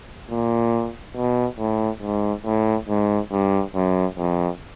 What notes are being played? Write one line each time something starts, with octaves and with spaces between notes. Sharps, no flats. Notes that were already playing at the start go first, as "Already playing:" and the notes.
A#2
B2
A2
G#2
A2
G#2
G2
F#2
F2